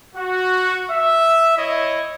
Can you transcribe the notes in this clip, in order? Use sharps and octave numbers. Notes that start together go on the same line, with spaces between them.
F#4
E5
E4 C#5 D#5